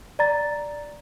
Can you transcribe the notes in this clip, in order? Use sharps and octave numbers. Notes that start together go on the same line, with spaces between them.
D5 A#5 A6